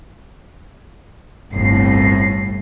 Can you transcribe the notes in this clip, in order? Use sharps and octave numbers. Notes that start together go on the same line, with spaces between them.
G1 C2 A2 C7